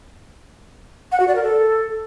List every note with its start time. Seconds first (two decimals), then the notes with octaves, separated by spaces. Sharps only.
1.12 F#5
1.20 F#4
1.28 D5
1.35 A#4
1.43 A4